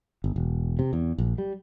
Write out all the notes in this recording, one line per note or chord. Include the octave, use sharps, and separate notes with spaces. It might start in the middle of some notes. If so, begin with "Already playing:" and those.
G1
E1
C3
E2
A#1
G3